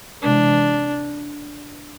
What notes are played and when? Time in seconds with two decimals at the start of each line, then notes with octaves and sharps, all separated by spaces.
0.22 C3 E3 G#3 D4